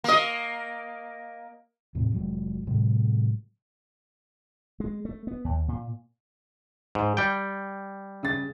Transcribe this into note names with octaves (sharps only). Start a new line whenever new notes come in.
A#3 D#5
E2 A2 C3
F1 F#3 G#3
A2 C3 F#3 G#3
G#3
A3
B3
D#2
A#2
G#2
G3 G5
C#3 A6